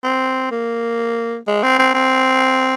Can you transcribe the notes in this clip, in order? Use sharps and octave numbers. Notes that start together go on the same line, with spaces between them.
C4
A#3
G#3
C4
C4
C4